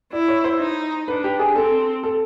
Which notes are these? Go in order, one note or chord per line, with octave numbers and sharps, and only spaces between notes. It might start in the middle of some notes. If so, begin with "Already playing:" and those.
E4 D5
C#5
C5
D#4
D4 B4
G4
G#4
C4 A4
A4